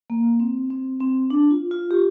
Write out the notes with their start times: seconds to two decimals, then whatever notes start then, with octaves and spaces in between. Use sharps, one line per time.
0.10 A#3
0.40 C4
0.70 C4
1.00 C4
1.30 D4
1.51 F4
1.71 F4
1.91 G4